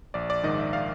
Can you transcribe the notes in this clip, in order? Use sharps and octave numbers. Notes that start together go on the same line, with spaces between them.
A#1 D5
D5
G#2 D#3 D#5
E5
F5